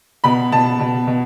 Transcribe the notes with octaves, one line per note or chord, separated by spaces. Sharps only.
B2 B5
B2 A5
B2
B2